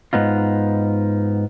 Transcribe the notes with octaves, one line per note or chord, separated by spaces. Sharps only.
G#2 B3 D#4 F4